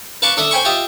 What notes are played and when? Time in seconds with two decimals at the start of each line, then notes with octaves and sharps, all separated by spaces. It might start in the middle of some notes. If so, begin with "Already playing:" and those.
0.22 B4 F5 A5 C#6 D6
0.37 D4 A4 E5 D#6
0.51 C5 G5 G#5 B5 C#6
0.65 F4 G4 D#5 E5